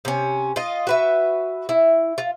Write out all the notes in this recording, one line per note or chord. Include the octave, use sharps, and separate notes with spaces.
C3 C#4
F4 D#5
F#4 B4 E5
E4
F4